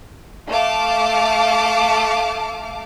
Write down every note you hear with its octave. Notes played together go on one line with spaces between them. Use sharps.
A3 F5 A5 D6